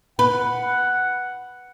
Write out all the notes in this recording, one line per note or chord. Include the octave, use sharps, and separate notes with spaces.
B4 F#5